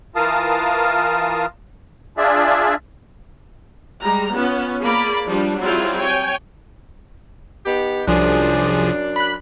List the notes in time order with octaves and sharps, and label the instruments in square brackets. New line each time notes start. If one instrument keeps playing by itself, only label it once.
[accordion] E3 F4 A#4 F5 A5 D#6
D4 F4 G#4 D5 E5
[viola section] G3 G#3 A#5
B3 C#4 F4
A#3 G#4 D5 B5
F3 G3 D4
F#3 G3 C4 E4 F4 G#4
C#5 G5 G#5
[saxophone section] B3 D#4 G4
[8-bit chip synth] C2 F3 G#4 [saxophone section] F#2 D4
[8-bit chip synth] B5 F#6